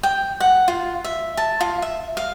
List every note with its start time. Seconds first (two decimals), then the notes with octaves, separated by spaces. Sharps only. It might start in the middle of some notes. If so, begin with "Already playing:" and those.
0.03 G5
0.40 F#5
0.68 F4
1.04 E5
1.37 A5
1.61 F4
1.82 E5
2.17 F5